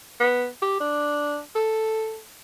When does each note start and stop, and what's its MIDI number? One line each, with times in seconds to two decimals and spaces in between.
0.20 0.46 59
0.62 0.76 67
0.80 1.39 62
1.55 2.19 69